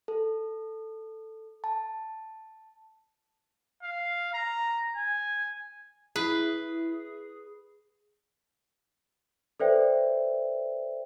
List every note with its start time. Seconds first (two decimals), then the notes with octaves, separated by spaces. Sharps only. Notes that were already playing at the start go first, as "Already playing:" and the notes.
0.08 A4
1.64 A5
3.83 F5
4.34 A#5
4.96 G#5
6.16 E4 G#4 B4
9.60 A4 B4 C5 D5 E5 G5